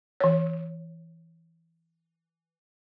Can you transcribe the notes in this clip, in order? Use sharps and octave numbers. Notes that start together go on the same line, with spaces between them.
E3 C#5